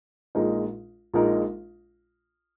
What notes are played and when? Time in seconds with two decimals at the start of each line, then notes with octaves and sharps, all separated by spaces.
0.35 A#1 A#2 G#3 D#4 A#4
1.14 A#1 A#2 G#3 D#4 A#4